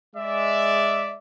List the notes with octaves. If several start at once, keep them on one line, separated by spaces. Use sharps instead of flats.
G#3 D5 E5